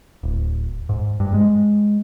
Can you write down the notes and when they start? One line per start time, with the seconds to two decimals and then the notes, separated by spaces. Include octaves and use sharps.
0.23 D1
0.89 G#2
1.20 G2
1.34 G#3